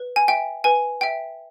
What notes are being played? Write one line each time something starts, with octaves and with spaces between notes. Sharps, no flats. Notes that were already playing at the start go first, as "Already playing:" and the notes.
Already playing: B4
G#5
E5 G5
B4 G#5
E5 G5